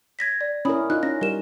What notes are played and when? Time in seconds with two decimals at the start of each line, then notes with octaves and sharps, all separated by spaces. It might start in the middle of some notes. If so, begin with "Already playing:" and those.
0.19 G#6 A#6 B6
0.41 D5
0.65 C#4 E4 A#4 B5 D#6
0.90 D#4 F4 F#6
1.03 C#4 A#6
1.21 G3 A#4 E7